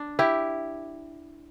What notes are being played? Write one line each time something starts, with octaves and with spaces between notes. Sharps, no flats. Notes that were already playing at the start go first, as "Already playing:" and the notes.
Already playing: D4
E4 G4